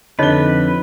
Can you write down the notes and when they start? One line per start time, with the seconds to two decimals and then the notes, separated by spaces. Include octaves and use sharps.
0.19 F2 D3 D#4 B4 C#5 D#5 G7